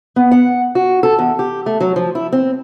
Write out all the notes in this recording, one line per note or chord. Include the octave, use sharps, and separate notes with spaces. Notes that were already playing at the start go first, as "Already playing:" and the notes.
B3
F#5
F#4
A4
E2
G4
A3
F#3
F3
E4
C4